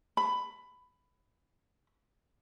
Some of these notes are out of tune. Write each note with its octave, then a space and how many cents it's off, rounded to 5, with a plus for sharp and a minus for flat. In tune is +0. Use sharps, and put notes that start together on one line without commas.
B5 +15